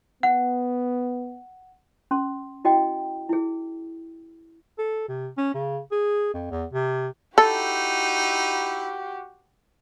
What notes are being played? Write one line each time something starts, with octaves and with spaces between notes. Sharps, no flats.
B3 F#5
C#4 C6
E4 F#4 D#5 G5
E4 G#4
A4
C3
C#4
C#3
G#4
F2
E2
C3
D#4 E4 F#4 G4 A4